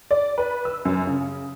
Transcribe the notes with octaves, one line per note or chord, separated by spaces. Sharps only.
D5
B4
E6
F#2
C#3